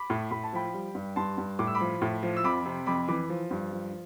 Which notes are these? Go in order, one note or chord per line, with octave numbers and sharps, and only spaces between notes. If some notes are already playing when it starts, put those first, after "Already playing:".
Already playing: B5 D6
A2
A2 B5
A5
F3 G5 B5
G3
G2
G2 A5 C6
G2
A2 D6
E6
B5 D6
F3
A2
F3
E6
F2 B5 D6
C3
F2 B5 D6
E3 B5 D6
F3
G2
F3